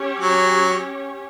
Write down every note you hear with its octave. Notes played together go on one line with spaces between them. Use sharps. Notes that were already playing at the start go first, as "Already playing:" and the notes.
Already playing: C#4 G4 C#5
F#3